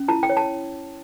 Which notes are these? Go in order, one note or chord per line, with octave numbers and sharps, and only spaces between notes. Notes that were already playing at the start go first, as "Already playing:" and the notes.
Already playing: C#4
E4 A5
G5
C#5
A5